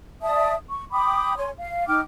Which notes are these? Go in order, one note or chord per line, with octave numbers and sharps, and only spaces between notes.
D5 E5 A5 D#6
C#6
G5 B5 D6 D#6
C#5 G#5 C6
F5
D#4 G5 D6 F6